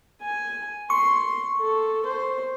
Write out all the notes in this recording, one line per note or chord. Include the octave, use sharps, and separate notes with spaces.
G#5
C6 C#6
A4
C5